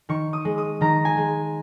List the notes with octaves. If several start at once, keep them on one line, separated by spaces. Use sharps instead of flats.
D#3 C#6
D#6
G#3
D#6
D#3 A#5
G#5
G#3